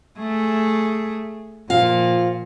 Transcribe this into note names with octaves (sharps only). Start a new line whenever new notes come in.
A3 G#4
A#2 F3 F5